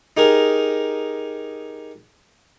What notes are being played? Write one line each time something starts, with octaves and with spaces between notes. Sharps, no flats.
D#4 G4 G#4 A#4